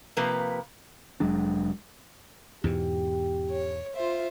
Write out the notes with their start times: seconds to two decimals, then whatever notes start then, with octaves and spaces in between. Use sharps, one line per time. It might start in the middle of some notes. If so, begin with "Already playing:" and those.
0.17 C3 F3 A#3 B4
1.20 F1 F#3 G#3 D4
2.64 E2 G#2 B2 G4
3.53 C#5
3.94 F4 C5 E5